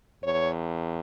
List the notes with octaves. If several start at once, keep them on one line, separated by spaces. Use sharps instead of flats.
E2 C#5